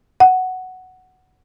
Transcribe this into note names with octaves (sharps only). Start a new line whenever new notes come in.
F#5